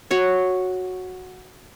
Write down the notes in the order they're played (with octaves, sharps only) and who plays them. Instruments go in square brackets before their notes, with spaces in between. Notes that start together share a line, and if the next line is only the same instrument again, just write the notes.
[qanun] F#4 C#5